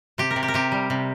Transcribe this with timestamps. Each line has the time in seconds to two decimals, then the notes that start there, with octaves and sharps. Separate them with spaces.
0.18 C3 G4
0.31 A#4
0.36 C3
0.43 G4
0.48 A#4
0.54 C3 G4
0.72 G3
0.90 C3